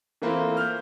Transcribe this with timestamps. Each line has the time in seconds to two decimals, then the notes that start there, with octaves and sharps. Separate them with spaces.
0.22 E3 A3 A#3 C4 E4 F4
0.57 F6 G6